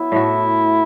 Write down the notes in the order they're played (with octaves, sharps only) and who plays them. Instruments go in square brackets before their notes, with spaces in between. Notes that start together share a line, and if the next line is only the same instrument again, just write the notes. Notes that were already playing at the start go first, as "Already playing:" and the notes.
Already playing: [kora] F#3 B3 [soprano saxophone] E4
[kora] A2 A3 F#4